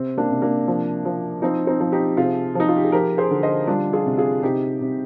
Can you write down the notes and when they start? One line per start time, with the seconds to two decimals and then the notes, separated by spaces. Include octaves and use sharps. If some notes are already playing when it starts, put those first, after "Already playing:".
Already playing: C3 C4
0.18 A#3 D4
0.30 C3
0.42 A#3 D4
0.68 F3
1.05 F3
1.42 F3 C4 D#4
1.67 C4 D#4
1.80 F3
1.92 D#4 G4
2.17 C3 F4 G#4
2.55 F3 D#4
2.69 F4
2.76 G4
2.84 G#4
2.92 F3 G4 A#4
3.18 G#4 C5
3.31 D3
3.43 C5 D#5
3.67 G3 D4 F4
3.93 F4 G#4
4.06 C3
4.17 F4 G#4
4.43 C3 D#4 G4
4.81 C3